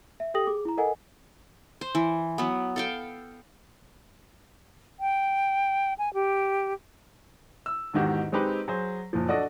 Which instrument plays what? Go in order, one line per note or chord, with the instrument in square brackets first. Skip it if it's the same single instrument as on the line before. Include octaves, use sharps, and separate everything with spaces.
[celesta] E5
G4 A4 G5 D#6 A#6 F#7
G#4 D6
E4 A#5
A4 A#4 D#5 F#5 G#5
[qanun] C5
E3
F#3 B3
A4 F5 G5
[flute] G5
G#5
G4
[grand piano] E6
E2 G#2 D#3 F#4 G4
G#3 C4 D#4 G4 B4
F#3 G#4 C5
F#1 A#2 F3
D4 F#4 A4 D5 D#5